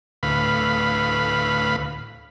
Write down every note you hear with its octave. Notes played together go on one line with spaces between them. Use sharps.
D2 A2 B4 F5 B5